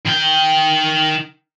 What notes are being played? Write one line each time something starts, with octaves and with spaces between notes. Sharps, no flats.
D#3 G5